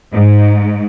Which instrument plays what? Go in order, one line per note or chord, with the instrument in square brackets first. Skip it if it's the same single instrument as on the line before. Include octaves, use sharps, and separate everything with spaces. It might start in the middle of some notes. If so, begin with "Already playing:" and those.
[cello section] G#2